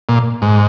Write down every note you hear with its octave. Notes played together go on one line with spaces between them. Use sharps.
A#2
G#2